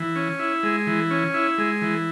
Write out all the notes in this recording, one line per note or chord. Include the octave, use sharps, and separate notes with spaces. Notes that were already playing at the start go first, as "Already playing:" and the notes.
Already playing: E3
C#4
E4
G#3
E3
C#4
E4
G#3
E3